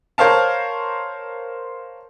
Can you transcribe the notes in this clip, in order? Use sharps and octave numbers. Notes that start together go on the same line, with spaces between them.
A#4 C5 C#5 F5 A5